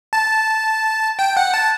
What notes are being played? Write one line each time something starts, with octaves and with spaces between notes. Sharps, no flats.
A5
G5
F#5
A5